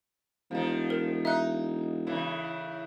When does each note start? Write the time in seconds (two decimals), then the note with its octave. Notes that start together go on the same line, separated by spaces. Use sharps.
0.51 E1 D#3 F3
0.90 A#4
1.25 D#4 E5 F#6
2.07 A2 C#3 E3